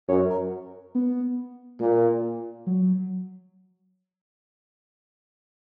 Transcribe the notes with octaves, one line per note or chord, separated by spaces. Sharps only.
F#2 C#5
A#4
B3
A#2 A#3
F#3